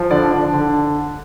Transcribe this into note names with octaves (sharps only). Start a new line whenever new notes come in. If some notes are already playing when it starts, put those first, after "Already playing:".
Already playing: F3
D3 D5
D3
D3